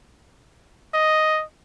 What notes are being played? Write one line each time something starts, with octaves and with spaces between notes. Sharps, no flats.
D#5